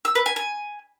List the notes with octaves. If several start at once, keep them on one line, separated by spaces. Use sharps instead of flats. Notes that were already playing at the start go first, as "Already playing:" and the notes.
E6
B4
G#5
G#5